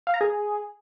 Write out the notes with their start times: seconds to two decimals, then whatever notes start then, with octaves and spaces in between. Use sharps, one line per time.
0.07 F5
0.14 A#5
0.21 G#4